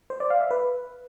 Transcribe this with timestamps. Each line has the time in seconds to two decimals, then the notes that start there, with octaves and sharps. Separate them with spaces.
0.10 C5
0.20 D5
0.30 F5
0.41 E5
0.51 B4